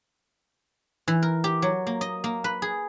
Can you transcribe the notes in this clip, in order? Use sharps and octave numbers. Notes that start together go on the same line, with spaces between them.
E3
A#4
G4
F#3
A#3
D#5
A#3
B4
G#4